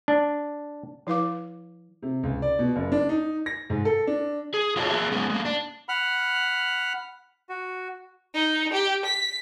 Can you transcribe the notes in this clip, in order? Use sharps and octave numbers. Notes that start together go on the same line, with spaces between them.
D4
F3 E4 B4 F5 D6
C3
C#2
D5
B2
F#1
D4
D#4
A#6
G#2
A4
D4
G#4
F4 F#4 C#5 D#5 G5 A5
A#3 G#4 E5
G#3 B3 C#4
G#3 A#3
D4
F#5 B5 F6
F#4
D#4
G4
B6